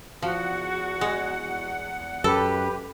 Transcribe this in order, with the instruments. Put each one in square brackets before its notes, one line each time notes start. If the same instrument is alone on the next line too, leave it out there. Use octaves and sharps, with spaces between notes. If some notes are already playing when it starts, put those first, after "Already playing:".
[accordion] E2 F#5 [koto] F3 [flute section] F#4
[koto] G#3
[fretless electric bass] F#2 [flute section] G4 B4 B5 [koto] A4